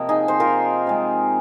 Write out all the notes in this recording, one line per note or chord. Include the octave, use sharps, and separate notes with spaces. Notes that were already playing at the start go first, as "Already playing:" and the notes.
Already playing: C3 F3 A#3 A#4 D#5
D#4 G#4
C5
F4 A#4
C3 G#3